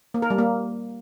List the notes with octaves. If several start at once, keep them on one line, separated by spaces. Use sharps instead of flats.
A#3
A#4
G3
A#3